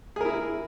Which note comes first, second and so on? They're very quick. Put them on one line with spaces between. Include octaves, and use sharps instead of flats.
G#4 A#4 E4